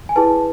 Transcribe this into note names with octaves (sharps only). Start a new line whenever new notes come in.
G#5
E4 G#4 B4 A5